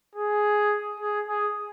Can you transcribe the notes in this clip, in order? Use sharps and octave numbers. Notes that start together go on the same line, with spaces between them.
G#4
G#4
G#4